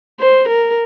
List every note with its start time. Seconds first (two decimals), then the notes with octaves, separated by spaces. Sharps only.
0.20 C5
0.49 A#4